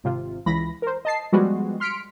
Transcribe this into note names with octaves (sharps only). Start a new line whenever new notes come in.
G#1 C3 F4
C#2 E3 B5 A#6
A#4 C5
D#5 A5 C7
F3 G3 G#3 B3 F#4
C6 F6 B6 C#7 D7